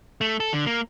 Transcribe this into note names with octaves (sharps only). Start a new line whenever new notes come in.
A3
A4
D3
A#3